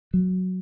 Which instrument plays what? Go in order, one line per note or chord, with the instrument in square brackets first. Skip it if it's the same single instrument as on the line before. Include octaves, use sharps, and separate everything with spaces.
[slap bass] F#3